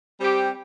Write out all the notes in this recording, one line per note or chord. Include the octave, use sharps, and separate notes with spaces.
G3 C4 G4